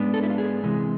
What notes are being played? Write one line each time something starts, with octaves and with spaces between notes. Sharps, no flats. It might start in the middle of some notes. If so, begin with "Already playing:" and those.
Already playing: G#2 G#3 B3 D4
A4
E4
F4
G#4
C3 E3 G#3